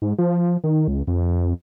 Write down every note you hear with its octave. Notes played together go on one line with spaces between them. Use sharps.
G#2
F3
D#3
C#2
F2